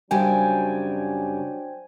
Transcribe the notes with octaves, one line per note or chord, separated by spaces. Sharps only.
F#2 C#3 F#3 G3 D4 C5 G5 G#5